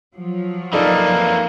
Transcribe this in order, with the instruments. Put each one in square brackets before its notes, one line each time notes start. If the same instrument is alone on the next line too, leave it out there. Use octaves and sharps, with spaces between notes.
[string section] F3 F#3
[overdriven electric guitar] E3 A#3 [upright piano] D#4 A4 D5